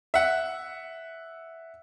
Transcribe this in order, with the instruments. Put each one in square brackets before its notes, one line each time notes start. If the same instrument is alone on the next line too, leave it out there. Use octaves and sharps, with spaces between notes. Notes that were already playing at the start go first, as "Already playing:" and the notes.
[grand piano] E5 F#5